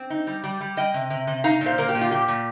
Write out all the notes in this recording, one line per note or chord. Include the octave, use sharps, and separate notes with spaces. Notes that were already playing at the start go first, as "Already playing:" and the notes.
Already playing: C4
D#4
G3
G3
G3
G3 D#5 G5
C3
C3
C3
D#4 F5 A#5
A#2
C5 F5
A#3 A#4
G4
A#2
F4
A#3 G4
A#2